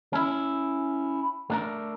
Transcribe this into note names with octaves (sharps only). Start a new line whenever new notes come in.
C#4 E4
A3 D4 A#4